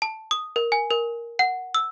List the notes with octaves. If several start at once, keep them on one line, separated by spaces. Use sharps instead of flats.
A5
D#6
A#4
G#5
A#4
F#5
E6